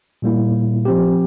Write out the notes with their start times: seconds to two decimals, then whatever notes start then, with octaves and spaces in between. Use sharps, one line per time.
0.22 A#2 G3 A#3 E4
0.85 F3 C4 G4